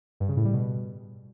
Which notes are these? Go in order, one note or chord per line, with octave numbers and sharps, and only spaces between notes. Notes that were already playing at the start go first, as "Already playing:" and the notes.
G2
C#3
A2
G3
B2